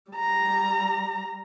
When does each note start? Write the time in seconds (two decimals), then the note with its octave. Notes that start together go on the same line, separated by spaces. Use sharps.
0.11 G3 A#5